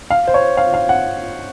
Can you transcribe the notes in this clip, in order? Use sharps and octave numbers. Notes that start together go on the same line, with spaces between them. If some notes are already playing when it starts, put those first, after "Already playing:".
F5
C5
C#5
F5
F5
F#5